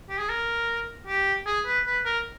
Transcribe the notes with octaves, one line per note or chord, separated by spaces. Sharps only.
G4
G#4
A#4
G4
G#4
B4
B4
A#4